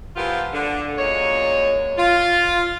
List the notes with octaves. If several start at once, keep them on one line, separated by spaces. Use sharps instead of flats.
E3 F3 B3 F4 G4 A#4
D3
F#2 A#2 G#3 C#5
F4